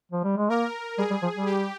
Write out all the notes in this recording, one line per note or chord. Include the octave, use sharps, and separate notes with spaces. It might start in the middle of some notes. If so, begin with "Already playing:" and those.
F3
G3
G#3
A#3 A#4
G3 G#4
G3
F3
G3
G4